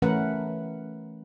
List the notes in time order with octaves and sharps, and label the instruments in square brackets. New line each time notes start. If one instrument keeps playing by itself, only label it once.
[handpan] E3 A3 C#4 A#4 B4 F#5